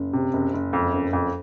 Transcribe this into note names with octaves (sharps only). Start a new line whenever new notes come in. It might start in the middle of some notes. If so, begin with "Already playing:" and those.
Already playing: F#1
C3
F#1
F#1
F2
F#1
F2